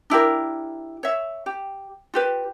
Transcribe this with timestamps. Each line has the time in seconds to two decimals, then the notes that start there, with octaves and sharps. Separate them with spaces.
0.10 D4 E4 G4 A#4
1.03 C#5 E5
1.46 G4
2.14 F4 G4 B4